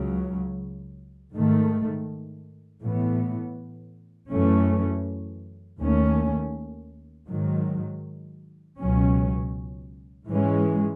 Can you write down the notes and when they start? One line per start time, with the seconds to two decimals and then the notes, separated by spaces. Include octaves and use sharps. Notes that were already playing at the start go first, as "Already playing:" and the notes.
Already playing: C#2 C#3 F#3
1.32 G#2 D#3 A3
2.81 A2 E3 B3
4.30 F#2 E3 A3 C#4
5.79 D#2 D#3 A3 C#4
7.28 G#2 D#3 F#3
8.77 C#2 B2 F#3 C#4
10.26 G#2 E3 G#3 C#4